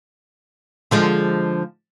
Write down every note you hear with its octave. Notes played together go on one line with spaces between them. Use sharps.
D3 F3 G#3